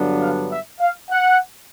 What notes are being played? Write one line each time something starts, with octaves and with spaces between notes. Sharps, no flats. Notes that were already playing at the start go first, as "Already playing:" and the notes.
Already playing: G2 D3 F#3 B3 D4
F5
E5
F5
F#5